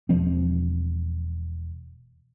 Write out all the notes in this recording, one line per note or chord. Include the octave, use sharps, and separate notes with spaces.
E1 D#2 F3 C4